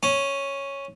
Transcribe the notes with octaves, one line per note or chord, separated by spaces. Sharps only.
C#4